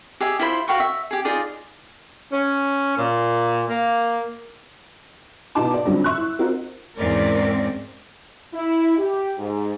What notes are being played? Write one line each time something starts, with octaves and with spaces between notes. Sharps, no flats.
G4 G#4 D#5 E5
E4 F4 C5 B5
F#4 F5 G5 C#6
E5
G4 G#4
D#4 F4 G#4 D5
C#4
A#2
A#3
B2 B3 D#4 E4 A5 D6
D5
G2 D3 F3 F#3 C4 C#4
E5 C#6 E6 F#6
E4
C4 D#4 F4 F#4 A#4
E2 G#2 C4 C#4 A#4 D5
E4
G4
G#2